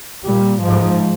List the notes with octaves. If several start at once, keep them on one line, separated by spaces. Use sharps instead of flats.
A#2 G3
G#2 F3